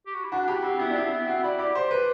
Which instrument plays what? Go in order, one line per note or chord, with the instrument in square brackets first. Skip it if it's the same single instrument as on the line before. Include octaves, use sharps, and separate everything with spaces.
[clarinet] G4
F#4
E4
[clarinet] D4 [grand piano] F#4
[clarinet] E4 [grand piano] G4
[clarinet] C4 [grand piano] F#4
[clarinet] B3 [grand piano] E4
[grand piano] D4
[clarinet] C4 [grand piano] E4
[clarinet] B3
[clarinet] C4 [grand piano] F#4
[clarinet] E4 [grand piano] D5
[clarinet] G4 [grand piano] D5
[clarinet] G4 [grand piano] C5
[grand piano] B4